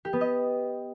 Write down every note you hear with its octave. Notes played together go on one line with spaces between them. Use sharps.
G4
B3
D#5